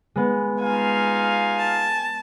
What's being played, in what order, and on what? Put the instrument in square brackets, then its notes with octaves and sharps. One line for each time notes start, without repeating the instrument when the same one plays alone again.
[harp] G#3 B3
[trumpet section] D#4 F4 F5 [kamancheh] G#5
[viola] A5